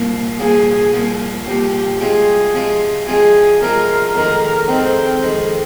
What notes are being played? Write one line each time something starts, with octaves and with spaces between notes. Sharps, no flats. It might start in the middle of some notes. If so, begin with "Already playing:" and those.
Already playing: C2 A#2 F3 A#3
C2 A#2 F3 A#3 G#4
C2 A#2 F3 A#3
C2 A#2 F3 A#3 G4
C3 F3 G#3 C4 F4 G#4
C3 F3 G#3 C4 F4
C3 F3 G#3 C4 F4 G#4
C3 F3 G#3 C4 F4 A#4
F2 D#3 G#3 A#4
F2 D#3 G#3 C4
F2 D#3 G#3